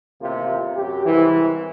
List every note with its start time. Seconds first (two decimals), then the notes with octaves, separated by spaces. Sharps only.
0.21 A1 D#2 C3 A#3 F4
0.76 F#2 F#4 G4
1.06 C2 G#2 E3